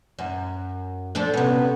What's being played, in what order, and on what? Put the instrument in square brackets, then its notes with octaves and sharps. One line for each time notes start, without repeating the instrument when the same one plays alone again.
[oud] F#2
F3 D4 A4
[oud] C3 C#4 [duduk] B3